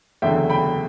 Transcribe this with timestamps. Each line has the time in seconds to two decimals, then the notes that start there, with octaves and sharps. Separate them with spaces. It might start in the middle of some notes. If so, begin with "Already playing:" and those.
0.22 F#1 E2 D3 F#3 A3 E5 G5
0.50 G5 B5